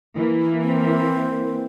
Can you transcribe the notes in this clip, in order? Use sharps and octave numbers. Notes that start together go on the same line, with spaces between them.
E3 A#3
C4